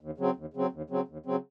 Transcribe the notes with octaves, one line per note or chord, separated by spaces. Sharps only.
D#2
C#3 F#3 C4
D#2
C#3 F#3 C4
D#2
C#3 F#3 C4
D#2
C#3 F#3 C4